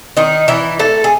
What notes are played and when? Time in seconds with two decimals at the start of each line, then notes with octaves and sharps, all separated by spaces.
0.17 D#3 D#4
0.48 E3 E4
0.79 A3 A4
1.04 G#4